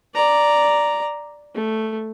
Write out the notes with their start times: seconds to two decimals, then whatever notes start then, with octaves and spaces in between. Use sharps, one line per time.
0.15 D5 A#5
1.55 A3